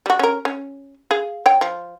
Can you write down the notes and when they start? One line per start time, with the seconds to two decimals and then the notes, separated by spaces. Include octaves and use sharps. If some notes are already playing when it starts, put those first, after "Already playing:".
0.06 G3 F#4
0.19 C#4 A#4
0.45 C#4
1.11 G#4 F5
1.46 C#5 G5
1.61 F3